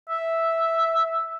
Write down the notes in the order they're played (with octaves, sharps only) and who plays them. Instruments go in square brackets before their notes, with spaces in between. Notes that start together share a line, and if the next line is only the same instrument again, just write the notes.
[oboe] E5